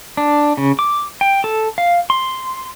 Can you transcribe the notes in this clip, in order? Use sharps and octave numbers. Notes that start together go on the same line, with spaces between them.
D4
C#3
D6
G5
A4
F5
C6